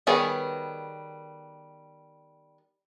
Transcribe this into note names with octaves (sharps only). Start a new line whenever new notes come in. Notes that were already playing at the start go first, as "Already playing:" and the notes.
D#3 G3 B3 G#4 C#5